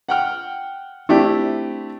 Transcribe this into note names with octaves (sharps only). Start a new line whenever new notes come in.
F#5 G5 F6
A3 C4 D4 E4 G4